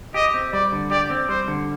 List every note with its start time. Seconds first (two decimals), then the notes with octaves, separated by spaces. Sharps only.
0.14 G4 D#5
0.34 C4
0.53 G3 D5
0.72 D3
0.91 G4 D5
1.10 C4
1.29 G3 C5
1.48 D3